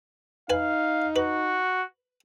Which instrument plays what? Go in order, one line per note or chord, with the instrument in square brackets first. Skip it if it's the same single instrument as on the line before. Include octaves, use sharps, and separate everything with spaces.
[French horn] D#4 [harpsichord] B4 G#5 [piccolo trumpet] F5
[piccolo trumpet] F#4 [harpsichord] B4